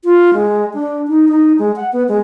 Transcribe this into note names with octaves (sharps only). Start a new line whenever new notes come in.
F4
G#3
D4
D#4
D#4
G#3
F#5
B3
G#3